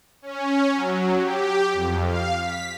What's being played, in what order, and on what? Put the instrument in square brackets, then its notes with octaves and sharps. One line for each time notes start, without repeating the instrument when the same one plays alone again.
[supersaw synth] C#4
F#3
G4
F2
F5
B6